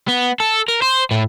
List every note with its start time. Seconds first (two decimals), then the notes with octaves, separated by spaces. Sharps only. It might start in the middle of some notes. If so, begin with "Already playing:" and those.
0.08 B3
0.40 A4
0.68 A#4
0.82 C5
1.11 A2